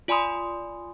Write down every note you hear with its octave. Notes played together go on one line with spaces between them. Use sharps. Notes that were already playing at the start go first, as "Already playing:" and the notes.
F4 D5 G#5 B5 C6 D#6